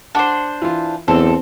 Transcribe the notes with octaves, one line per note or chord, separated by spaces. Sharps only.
D4 C5 F#5 D6
E3 F4
E2 C4 A4